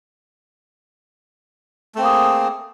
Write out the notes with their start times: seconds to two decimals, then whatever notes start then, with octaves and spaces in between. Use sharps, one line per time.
1.95 A3
1.98 C4
2.01 A#3
2.04 G#4